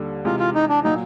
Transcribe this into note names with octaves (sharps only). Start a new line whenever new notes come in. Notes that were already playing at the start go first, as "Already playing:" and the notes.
Already playing: D#2 D3 G3
C3 E3 G#3 F4
F4
D#4
D4
A#2 F#3 D#4